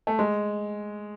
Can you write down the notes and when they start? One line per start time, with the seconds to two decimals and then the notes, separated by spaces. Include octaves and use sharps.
0.07 A3
0.19 G#3